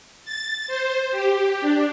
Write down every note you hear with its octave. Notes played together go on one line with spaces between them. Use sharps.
A6
C5
G4
D4